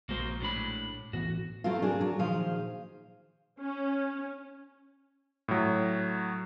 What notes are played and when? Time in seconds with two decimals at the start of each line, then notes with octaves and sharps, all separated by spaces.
0.09 A#1 G#3 A#3 F#4 C5
0.40 A2 D4 B5
1.13 A2 E3 B3 F#4
1.64 F#3 A3 C4 E4 F4
1.82 D4 G#4 A#4
2.01 F#3
2.19 A#2 D#3 F3 G#4 C5 F5
3.59 C#4
5.48 A2 F#3